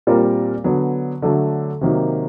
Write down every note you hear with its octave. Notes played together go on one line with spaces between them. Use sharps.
A#2 G3 C4 F4 A#4
D3 F#3 B3
D3 F#3 A3
C3 D#3 F#3 A#3 D#4